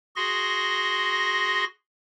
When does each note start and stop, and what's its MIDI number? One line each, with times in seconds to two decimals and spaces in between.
0.16 1.64 66
0.16 1.64 68
0.16 1.64 84
0.16 1.64 94